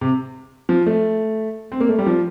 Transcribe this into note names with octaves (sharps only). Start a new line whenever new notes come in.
C3
F3
A3
C4
A#3
A3
G3
F3